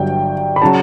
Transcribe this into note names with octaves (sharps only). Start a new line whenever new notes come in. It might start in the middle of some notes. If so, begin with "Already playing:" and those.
Already playing: G1 G2 F#3 G5
B5
C#3 F#3 A5